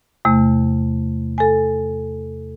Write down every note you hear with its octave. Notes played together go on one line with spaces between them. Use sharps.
E2 C3 A3
A4 G#5